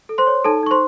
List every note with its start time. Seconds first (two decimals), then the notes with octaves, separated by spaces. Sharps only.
0.09 A4
0.18 C5 C6
0.27 C#5
0.44 D#4 A4 A5
0.63 D#4 C#6
0.71 C5 C6